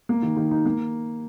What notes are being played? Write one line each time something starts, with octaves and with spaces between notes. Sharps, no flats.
A#3
D#3
D#3
D#4
A#3